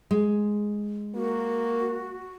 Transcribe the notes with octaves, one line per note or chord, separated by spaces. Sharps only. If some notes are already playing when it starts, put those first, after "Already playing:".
G#3
A#3 F#4